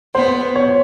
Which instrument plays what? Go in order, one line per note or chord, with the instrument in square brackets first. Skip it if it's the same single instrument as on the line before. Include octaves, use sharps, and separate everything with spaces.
[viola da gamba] B3 [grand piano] C5
[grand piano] C#5